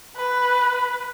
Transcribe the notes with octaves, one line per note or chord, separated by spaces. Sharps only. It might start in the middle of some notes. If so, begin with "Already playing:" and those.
B4